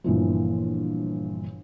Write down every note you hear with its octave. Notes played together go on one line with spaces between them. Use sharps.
G1 A#2 E3 F3